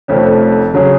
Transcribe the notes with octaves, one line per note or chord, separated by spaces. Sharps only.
F1 F2 F3 A3 C#4
C#3 F#3 C#4 G#4